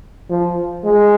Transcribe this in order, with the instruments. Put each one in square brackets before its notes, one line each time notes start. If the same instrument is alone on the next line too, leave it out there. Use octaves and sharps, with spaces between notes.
[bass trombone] F3
G#3